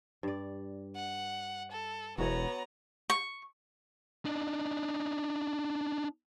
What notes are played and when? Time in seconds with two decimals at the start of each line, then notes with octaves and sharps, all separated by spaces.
0.23 G2 D5
0.95 F#5
1.72 A4
2.18 E1 B3 F#4 C#5 A#5
3.10 C#6
4.25 D4 D#4